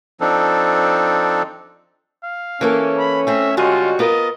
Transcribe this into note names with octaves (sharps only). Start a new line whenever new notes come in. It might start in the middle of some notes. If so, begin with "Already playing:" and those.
F3 C4 D4 D#4 A4
F5
E3 A#3 C#4 A4
B5
A3 C4 G#4 E5
D3 G3 G#3 C#4 F4 F#4 D#5
B3 F4 A#4 D#5